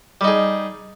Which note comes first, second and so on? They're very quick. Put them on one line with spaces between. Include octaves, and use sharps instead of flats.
G3 D#4 G#4